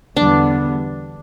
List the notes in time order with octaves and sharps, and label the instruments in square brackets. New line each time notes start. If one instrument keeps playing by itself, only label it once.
[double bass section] E2 D3 G3 B3 [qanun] D4